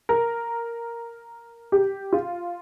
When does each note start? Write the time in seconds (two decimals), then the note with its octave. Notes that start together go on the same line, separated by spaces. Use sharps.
0.09 A#4
1.72 G4
2.13 F4